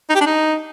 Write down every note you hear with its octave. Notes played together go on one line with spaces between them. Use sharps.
D#4
G4
D4
D#4